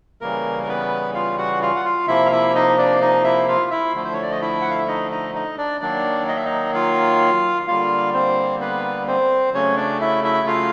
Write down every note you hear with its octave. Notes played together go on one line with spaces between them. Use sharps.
C#3 E3 G3 A#3 A#4
A#4
B3 B4
F4 F5
F#4 F#5
F4 F5
F#5
F4 F5
C3 F3 A#3 E4 E5
F5
E4 E5
D#4 D#5
D4 D5
D#4 D#5
E4 E5
F4 F5
E4 E5
D3 F3 A3
C5
C#5
D5
D#5
E4 E5
F#5
F5
E5
D#4 D#5
D#4 D#5
D#4 D#5
D4 D5
D#3 F#3 A#3 D4 D5
D#5
E5
D#4 D#5
F4 F5
D3 G3 A#3 F4 F5
C4 C5
B3 B4
C4 C5
C#3 F#3 A3 C#4 C#5
D4 D5
E4 E5
E4 E5
F4 F5